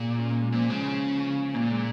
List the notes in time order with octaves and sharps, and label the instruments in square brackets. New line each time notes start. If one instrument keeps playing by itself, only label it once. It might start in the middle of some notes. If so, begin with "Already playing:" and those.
Already playing: [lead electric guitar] A#2 [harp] D#4 G#4 C#5
[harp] C#4 F4
A#3 D#4
G#3
[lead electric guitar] A#2 [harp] F3 A#3
[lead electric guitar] C#3 [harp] G#3 C#4
[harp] C#4 F4
[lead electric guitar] A#2 [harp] A#3 D#4
[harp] G#3